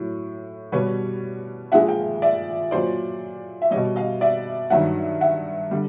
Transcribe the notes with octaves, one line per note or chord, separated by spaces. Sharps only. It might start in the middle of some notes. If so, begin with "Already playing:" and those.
Already playing: A2 F#3
B2 G3 B4 C#5
A#2 F3 G#3 E5 F#5
F5 G5
D5 E5
A#2 F#3 C5 D5
E5
G3 C#5 D#5
B2
D#5 F5
D5 E5
G2 D#3 F#3 E5 F#5
E5 F#5
D3 G3